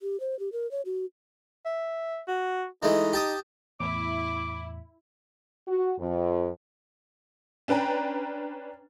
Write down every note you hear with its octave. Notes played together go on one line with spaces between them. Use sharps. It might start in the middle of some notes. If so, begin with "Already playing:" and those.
G4
C5
G4
A#4
C#5
F#4
E5
F#4
E3 G#3 A3 D#4
G4 A5 D#6
E2 A2 E4 D6
F#4
F2
C#4 D4 B4 G5 A#5